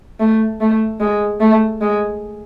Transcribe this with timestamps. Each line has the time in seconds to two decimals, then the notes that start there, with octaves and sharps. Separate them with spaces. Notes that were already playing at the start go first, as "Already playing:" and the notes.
0.20 A3
0.60 A3
1.00 G#3
1.41 A3
1.81 G#3